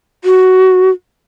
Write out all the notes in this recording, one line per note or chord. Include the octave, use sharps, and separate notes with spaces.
F#4